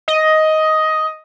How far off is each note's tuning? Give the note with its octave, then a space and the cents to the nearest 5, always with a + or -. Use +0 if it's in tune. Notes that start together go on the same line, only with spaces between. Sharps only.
D#5 +10